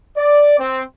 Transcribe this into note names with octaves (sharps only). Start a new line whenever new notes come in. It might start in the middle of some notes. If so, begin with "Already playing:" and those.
D5
C4